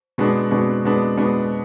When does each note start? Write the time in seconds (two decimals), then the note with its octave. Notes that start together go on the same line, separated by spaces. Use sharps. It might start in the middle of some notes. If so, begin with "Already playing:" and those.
0.18 B2 G#3 B3 D4
0.51 B2 G#3 B3 D4
0.84 B2 G#3 B3 D4
1.17 B2 G#3 B3 D4